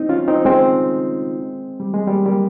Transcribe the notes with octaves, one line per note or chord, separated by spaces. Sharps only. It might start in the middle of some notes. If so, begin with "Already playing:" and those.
Already playing: C4 D#4
C#4 F4
C4 D#4
G#3 C4
G3
G#3
G3 A#3
G3 A#3